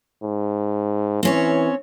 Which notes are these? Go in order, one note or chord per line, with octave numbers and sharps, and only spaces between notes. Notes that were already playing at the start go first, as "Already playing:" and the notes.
G#2
E3 C4 C#4 C#5